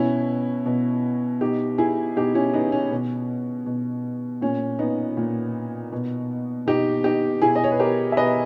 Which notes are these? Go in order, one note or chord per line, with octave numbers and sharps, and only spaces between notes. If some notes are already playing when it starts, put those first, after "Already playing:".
Already playing: B2 C#4 E4
B2
B2 D#4 G4
E4 G#4
B2 D#4 G4
C#4 E4
B3 D#4
C#4
B2
B2
A#2 C#4
B3 D#4
A#2
B2
B2 D#4 G4
D#4 G4
B2 E4 G#4
D#5
C#5
B4
G4 A#4
E5
B2 B4 D#5